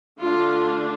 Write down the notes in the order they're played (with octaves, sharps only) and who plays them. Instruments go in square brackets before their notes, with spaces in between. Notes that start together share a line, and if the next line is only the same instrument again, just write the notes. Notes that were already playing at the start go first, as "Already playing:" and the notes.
[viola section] D3 A3 D4 F4